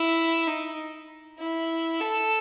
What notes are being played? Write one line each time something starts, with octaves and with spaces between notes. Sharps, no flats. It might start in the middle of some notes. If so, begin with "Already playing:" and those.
Already playing: E4
D#4
E4
A4